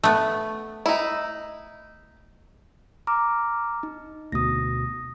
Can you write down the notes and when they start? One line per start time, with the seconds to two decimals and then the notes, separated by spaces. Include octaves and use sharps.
0.04 A3 B3
0.86 D#4 E4
3.07 A#5 D6 F6
3.83 D#4
4.32 D2 B2 D#6 A#6